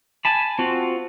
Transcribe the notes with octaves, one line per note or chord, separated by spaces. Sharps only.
G#5 A5 B5
C4 F4 F#4